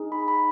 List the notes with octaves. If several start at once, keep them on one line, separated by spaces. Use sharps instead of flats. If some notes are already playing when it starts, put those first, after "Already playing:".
Already playing: D#4 G#4
B5
B5